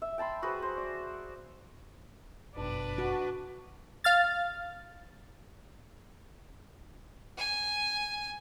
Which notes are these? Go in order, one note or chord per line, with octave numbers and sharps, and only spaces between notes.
E5
G5 A5 B5 C6
F#4 G#4 B4 C5
C5
D5
G1 F#2 B2 D4 B4
F#4
F5 F6 A6
G#5